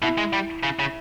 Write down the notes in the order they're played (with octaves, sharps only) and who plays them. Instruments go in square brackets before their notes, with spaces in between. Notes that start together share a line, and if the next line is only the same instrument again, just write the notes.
[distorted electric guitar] B2 [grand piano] E4
[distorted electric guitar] G#3
G3
C#3
C#3